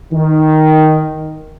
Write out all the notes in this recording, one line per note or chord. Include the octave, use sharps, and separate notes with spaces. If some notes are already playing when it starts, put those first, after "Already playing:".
D#3